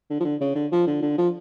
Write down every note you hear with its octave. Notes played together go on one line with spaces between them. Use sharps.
D3
F3
D3
C#3
D3
F3
D3
D3
F3